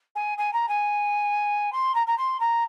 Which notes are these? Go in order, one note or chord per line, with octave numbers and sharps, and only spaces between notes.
G#5
G#5
A#5
G#5
C6
A#5
A#5
C6
A#5